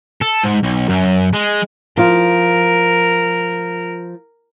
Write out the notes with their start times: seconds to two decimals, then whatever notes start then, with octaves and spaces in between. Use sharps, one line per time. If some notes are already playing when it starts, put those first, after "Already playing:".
0.21 A4
0.43 G#2
0.63 B1
0.89 F#2
1.33 G#3
1.97 F3 F4 A#4